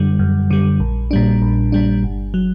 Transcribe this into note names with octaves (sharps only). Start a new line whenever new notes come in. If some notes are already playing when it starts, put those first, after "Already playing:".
Already playing: F#2 D3 G3
F#2
D3 G3
A#1
A#2 G3 D4
A#1
A#2 G3 D4
G1
F#3